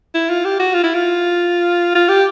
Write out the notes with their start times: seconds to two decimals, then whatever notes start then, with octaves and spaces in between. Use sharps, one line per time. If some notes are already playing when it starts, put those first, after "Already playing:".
0.14 E4
0.30 F4
0.45 G4
0.60 F#4
0.74 F4
0.84 E4
0.95 F4
1.95 F4
2.09 G4